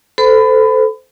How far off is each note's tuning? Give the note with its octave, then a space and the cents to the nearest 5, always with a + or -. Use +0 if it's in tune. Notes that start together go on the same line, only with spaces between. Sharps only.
A4 +0 C5 -25 B5 +25